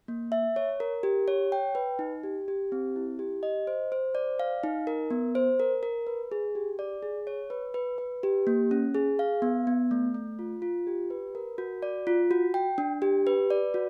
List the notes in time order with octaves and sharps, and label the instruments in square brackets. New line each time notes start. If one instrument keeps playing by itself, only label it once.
[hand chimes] A#3
E5
C#5
A#4
G4
C#5
G5
B4
D#4
G4
G4
C4
E4
G4
D#5
C5
C5
D5
F5
D#4
A#4
B3
C5
A#4
A#4
B4
G#4
G4
D5
G#4
C#5
B4
B4
B4
G4
A#3
C#4
G#4
F5
B3
B3
A3
A3
F4
F4
G4
B4
A#4
F#4
D5
F4
F#4
G5
D4
G4
B4
D5
F#4